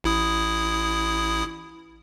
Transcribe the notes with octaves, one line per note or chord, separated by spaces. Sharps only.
A1 E4 D#6